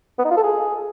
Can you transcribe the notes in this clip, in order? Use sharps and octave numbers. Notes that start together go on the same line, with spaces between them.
B3
D#4
F4
A4
G#4